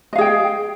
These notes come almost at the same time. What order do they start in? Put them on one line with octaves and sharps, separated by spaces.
D#5 F5 G#4 G5